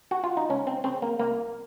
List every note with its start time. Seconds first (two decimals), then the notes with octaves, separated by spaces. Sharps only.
0.11 F#4
0.24 F4
0.37 D#4
0.50 C#2 C#4
0.67 C4
0.84 C#3 C4
1.02 A#3
1.20 C2 A#3